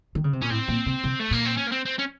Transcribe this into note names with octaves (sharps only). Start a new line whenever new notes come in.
D#3
C#3
C3
A#2 C#4
A2 C4
A#2
C3
C3
A3
A#2 A#3
C4
C#4
A#3
C4
C4
C#4